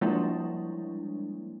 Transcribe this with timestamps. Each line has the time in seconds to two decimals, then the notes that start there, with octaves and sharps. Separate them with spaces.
0.01 F3 G3 G#3 A#3 D4 E4